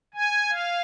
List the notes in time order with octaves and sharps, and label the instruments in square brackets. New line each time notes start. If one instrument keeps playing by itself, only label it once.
[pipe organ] G#5
F5